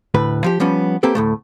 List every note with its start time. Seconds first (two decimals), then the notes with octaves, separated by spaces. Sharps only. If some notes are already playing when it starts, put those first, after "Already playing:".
0.14 D2 A2 B4
0.44 F3 G4
0.60 F3 G3 B3 C#4
1.03 A#3 C4 G4 A4 B4
1.15 D2 A2 A3